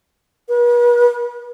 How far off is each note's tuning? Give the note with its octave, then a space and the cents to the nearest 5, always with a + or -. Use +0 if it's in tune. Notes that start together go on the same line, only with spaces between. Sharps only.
B4 -45